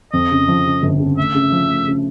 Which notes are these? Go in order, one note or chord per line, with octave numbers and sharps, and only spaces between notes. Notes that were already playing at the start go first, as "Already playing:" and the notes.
F2 D#5
C#3
F3
C#3
G1
C#3
A3 E5
C#3
F3
A3
C#3